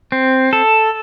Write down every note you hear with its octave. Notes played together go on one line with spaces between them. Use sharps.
C4
A4